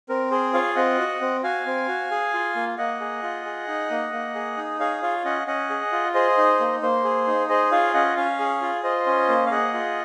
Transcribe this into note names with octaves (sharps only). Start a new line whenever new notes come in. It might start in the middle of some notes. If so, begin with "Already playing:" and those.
C4 A#4
G#4 C5
F4 C#5 F5
C4 D#5 F#5
F#4
C4
F#4 F5 G#5
C4
F#4
G#4
F4
A#3
A#3 D#5 F#5
G#4
F4
G#4
D#4
A#3
A#3
G#4
D#4
G#4 C#5 F5
F4 C#5 F5
C#4 D#5 F#5
C#4 D#5 F#5
G#4
F4
G#4 C5 D#5
D#4
A#3
A#3 C5
G#4
D#4
G#4 C5 D#5
F4 C#5 F5
C#4 D#5 F#5
C#4 C#5 F5
G#4
F4
F4 C5 D#5
C#4
A#3
F5
G#4 D#5 F#5
F4